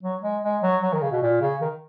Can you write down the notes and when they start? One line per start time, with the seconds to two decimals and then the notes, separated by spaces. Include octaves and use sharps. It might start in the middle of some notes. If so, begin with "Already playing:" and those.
0.03 F#3
0.23 G#3
0.43 G#3
0.63 F#3
0.83 F#3
0.93 D#3
1.03 C#3
1.12 B2
1.22 A#2
1.41 C#3
1.61 D#3